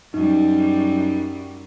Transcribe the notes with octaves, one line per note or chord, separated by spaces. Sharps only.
F#2 G3 D#4